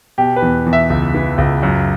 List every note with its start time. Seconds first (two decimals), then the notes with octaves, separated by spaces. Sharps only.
0.18 B2 G4
0.36 B4
0.42 E2
0.66 E2
0.73 E5
0.90 C#2
1.14 E3
1.38 C#2
1.63 F#2